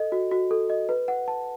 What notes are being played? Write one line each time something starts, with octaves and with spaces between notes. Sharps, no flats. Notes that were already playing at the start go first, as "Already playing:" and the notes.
Already playing: A4 D#5
F#4
F#4
A4
D#5
B4
F#5
A5